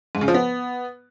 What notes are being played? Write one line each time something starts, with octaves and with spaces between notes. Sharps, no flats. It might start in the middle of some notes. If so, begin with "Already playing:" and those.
G#2
C#3
F3
B3